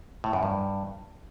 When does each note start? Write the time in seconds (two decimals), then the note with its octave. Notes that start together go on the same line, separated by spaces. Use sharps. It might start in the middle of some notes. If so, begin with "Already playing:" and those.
0.24 A2
0.33 F#2
0.43 G2